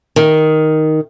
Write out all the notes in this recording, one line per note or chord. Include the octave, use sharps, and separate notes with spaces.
D#3